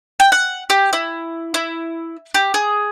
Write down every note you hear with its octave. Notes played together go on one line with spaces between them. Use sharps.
G5
F#5
G4
E4
E4
G4
G#4